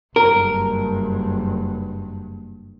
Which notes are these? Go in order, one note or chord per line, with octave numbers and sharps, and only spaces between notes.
F#1 G2 A#4